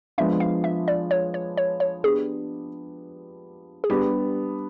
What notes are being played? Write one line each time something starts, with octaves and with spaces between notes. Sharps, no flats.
F3 G#3 B3 D4 F4 E5
F5
E5
D5
C#5
C#5
C#5
C#5
B3 D4 G4 G#4
G#4
G3 B3 D4 G4